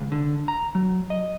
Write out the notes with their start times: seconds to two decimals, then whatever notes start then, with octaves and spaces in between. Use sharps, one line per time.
0.01 C#2
0.12 D3
0.48 A#5
0.75 F#3
1.10 D#5